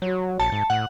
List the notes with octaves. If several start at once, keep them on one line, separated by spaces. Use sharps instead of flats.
F#3 F#4 C#5
A#1 A5 C#7
G#2
A2 F#5